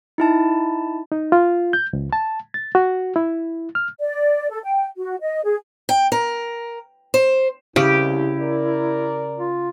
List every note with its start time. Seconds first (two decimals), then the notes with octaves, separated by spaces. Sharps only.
0.18 D#4 E4 A5
1.12 D#4
1.32 F4
1.73 G6
1.93 C#2
2.13 A5
2.54 A6
2.75 F#4
3.16 E4
3.75 F6
3.99 D5
4.50 A4
4.64 G5
4.97 F#4
5.22 D#5
5.44 G#4
5.89 G5
6.12 A#4
7.14 C5
7.76 C2 C#3 E4 G4
8.40 A#4 D5
9.38 F4